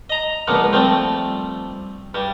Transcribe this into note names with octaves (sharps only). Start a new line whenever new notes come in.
D#5 A#5
C#2 A#2 F3 A#3 B3
F3 G3 A3 C4
G2 G3